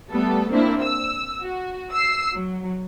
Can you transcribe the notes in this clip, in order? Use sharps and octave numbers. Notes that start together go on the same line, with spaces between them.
G3 A3 B3 A4
A#3 C4 D4 E4
E6
F#4
E6 C7
F#3